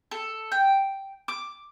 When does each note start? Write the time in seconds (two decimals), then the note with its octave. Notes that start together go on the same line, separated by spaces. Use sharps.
0.11 A4
0.52 G5
1.28 D6